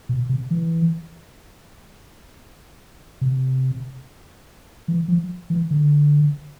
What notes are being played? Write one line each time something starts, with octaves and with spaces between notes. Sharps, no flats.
B2
C3
E3
C3
E3
F3
E3
D3